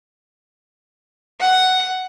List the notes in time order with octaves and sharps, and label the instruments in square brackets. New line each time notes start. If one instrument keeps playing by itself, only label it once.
[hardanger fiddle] F#5